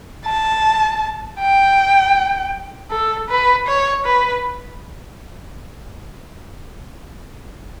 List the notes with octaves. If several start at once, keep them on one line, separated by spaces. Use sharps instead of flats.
A5
G5
A4
B4
C#5
B4